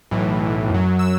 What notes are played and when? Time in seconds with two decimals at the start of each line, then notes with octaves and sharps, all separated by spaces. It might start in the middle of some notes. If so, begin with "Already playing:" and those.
0.11 B1 A2 E3
0.69 F#2 F#3
0.99 E6